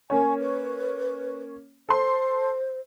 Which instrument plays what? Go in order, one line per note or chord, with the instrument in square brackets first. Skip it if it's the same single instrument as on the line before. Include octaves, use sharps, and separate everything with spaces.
[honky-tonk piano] A#3 C#4 C#5 [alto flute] G#5
[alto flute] B4
[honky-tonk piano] A4 C6 [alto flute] C5